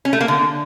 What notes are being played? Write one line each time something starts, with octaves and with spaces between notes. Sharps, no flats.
C#4
A3
A#3
D3